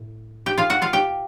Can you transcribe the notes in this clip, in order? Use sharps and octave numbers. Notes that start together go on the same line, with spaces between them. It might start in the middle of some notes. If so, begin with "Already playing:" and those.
Already playing: A2
G4 G5
F4 F5
F#4 F#5
F4 F5
G4 G5